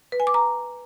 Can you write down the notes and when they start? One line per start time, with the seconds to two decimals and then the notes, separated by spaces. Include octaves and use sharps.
0.12 B4
0.20 G#5
0.27 D6
0.34 A#5